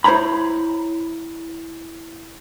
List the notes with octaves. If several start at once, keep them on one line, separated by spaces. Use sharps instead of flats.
E4 C5 C#5 A#5 B5